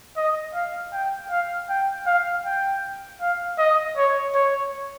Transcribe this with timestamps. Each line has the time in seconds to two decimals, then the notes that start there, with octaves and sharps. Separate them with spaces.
0.17 D#5
0.54 F5
0.93 G5
1.30 F5
1.69 G5
2.07 F5
2.45 G5
3.21 F5
3.58 D#5
3.97 C#5
4.35 C#5